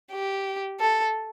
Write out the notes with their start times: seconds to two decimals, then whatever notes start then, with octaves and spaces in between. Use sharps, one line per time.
0.12 G4
0.80 A4